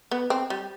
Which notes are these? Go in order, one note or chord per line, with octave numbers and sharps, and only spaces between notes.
B3
C4
G3